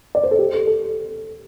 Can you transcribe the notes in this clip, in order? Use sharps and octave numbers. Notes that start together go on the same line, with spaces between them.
D5
C5
A4
G4
A4
A4